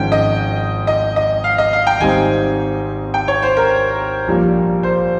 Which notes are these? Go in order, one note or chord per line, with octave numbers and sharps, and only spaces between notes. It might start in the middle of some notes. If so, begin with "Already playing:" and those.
Already playing: G#1 G#2 F3 G#3 C#4 G5
D#5
D#5
D#5
F5
D#5
F5
G5
G#1 G#2 G3 C4 D#4 G#5
G5
C#5
C5
A#4
A#1 A#2 G3 A#3
C5